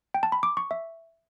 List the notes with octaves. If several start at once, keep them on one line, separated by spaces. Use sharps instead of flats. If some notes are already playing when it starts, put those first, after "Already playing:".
G5
A5
B5
D6
C#6
E5